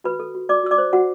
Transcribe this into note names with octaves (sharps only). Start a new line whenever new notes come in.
F#4 B4 B5
A4
F#4
F#4 D5 D6
F#4 E6
D5 D6
C5
F#4 F#5